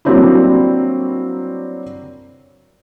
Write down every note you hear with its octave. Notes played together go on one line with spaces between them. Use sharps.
F#3 G3 A#3 C4 D4 E4